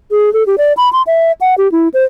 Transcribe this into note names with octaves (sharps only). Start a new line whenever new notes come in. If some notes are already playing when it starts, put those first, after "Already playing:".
G#4
A4
G4
D5
B5
C6
E5
F#5
G4
E4
C5